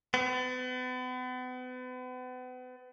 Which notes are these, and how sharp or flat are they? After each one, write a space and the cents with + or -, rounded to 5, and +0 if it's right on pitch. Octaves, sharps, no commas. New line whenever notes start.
B3 +40